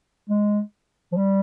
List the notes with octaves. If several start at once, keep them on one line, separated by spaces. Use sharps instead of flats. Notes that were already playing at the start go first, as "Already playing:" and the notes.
G#3
F3
G3